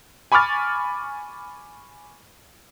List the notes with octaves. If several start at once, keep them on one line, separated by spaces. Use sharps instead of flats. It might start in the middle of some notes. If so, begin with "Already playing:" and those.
G#5 B5 C#6 D6 F6 A6